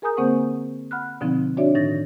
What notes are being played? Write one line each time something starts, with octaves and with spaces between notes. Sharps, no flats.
G#4 A#4 G#5 A#5 D#6 G6
D3 A#3 C4 C5 F#5 C#6
F#5 B5 F6 F#6
B2 D3 F3 C4 D#4
D4 F#4 C#5 D5 E5
A2 D#3 D#4 A6 A#6